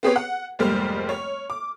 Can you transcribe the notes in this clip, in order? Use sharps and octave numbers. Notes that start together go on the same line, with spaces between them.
B3 C4 G4 G#4 B4 C#5
F#5
F1 G#2 G3 A#3 C5 F6
C#5
D6